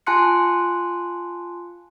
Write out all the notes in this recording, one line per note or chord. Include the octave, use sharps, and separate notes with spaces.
F4 G#5 A5 C6 F#6 C#7